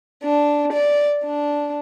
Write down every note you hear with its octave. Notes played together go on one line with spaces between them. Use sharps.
D4
D5
D4